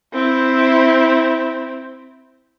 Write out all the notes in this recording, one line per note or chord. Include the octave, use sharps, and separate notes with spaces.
C4 E4